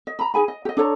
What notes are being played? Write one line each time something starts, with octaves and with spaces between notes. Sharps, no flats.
D#5
A#5 B5
D#4 G#4 G#5 B5
D#5
G4 D#5
D4 A4 C#5 A#5